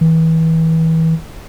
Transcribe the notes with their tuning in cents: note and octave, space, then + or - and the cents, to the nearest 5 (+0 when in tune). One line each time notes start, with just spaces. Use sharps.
E3 -30